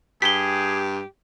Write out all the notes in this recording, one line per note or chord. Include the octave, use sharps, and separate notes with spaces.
G2 G4 G#4 B6 G7